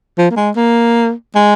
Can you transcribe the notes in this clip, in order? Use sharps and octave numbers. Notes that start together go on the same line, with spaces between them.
F3
A#3
G#3
A#3
G#3